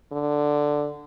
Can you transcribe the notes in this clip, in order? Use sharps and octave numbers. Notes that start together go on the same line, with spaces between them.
D3